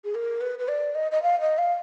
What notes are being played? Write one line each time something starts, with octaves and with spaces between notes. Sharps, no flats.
G#4
A#4
B4
B4
D5
D#5
D#5
F5
D#5
F5